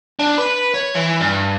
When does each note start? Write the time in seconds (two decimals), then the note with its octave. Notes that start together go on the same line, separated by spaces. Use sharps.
0.19 D4
0.38 B4
0.74 C#5
0.94 E3
1.20 G2